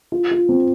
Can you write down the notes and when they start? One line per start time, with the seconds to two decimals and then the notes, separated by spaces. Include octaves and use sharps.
0.12 F4
0.31 F4
0.49 C4